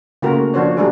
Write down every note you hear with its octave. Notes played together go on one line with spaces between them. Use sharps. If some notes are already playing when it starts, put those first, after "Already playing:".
C#3 A3 A#3 F4 F#4 A#4
F3 D4 F#4 C5 C#5
F#3 G3 A3 D4 G#4